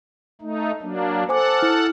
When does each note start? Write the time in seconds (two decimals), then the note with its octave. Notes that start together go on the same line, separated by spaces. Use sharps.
0.41 A3 D#4
0.81 F#3 A#3 D4
1.29 A4 C5 F#5 G#5 D6
1.59 E4 F6